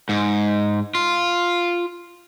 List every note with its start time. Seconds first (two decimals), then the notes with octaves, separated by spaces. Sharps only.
0.09 G#2
0.95 F4